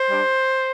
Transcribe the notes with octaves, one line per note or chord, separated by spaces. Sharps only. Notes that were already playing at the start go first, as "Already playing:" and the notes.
Already playing: C5
G3 D4